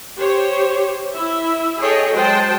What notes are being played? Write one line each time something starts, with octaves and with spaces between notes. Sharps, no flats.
G4 C5 C#5
E4 E5
G#4 A4 C#5 D#5 G5
F#3 G#3 C5 G5 A5